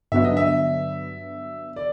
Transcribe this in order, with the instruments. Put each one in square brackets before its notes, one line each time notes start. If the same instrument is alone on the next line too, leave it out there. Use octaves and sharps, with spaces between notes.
[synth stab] G2 D3 F#3 B3 D4 [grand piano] E5
[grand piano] D#5
E5
D5